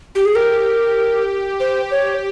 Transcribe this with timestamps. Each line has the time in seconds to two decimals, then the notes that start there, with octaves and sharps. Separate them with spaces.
0.15 G4
0.25 G#4
0.35 G4 A#4
1.60 G4 C5
1.91 C#5